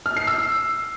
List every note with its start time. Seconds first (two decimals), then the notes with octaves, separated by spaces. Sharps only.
0.06 F6
0.17 C7
0.27 E6